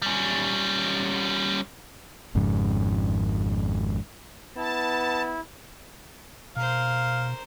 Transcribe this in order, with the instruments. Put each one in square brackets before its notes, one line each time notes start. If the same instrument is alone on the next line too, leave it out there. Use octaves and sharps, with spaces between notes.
[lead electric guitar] G3 C#4
[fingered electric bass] G#1 F2 G#2 C#3
[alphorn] B3 [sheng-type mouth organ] E4 [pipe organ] A5
[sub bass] B2 [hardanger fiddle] A#4 C5 [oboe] F5